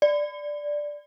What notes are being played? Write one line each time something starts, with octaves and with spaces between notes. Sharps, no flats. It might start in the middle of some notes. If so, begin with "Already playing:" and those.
D5